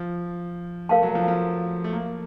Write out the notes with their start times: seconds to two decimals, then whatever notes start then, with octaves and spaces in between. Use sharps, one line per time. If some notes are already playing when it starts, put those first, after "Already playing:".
Already playing: F3
0.89 A3 A#4 F5 A5
1.03 F#3
1.15 F3
1.28 F3
1.84 A3
1.93 A#3